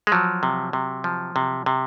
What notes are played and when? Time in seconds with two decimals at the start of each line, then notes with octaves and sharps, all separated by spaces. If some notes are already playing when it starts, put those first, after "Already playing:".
0.07 G#3
0.12 F3 F#3
0.43 C3
0.73 C3
1.04 F3
1.36 C3
1.66 C3